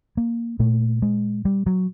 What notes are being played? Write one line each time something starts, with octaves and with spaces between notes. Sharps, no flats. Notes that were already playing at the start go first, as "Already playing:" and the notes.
A#3
A#2 A3
G#3
G3
F#3